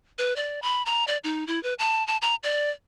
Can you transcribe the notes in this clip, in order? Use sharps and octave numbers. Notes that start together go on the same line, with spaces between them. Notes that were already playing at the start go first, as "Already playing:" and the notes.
B4
D5
B5
A#5
D5
D#4
E4
B4
A5
A5
A#5
D5